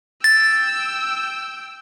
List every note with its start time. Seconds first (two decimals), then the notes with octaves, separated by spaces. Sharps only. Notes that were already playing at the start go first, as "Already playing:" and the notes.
0.24 G5 E6 A6